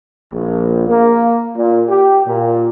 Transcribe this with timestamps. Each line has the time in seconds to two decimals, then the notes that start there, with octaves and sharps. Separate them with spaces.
0.33 A#1
0.87 A#3
1.55 A#2
1.89 G4
2.26 A#2